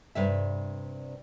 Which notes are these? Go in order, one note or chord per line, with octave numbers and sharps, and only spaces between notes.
G2 C3 E5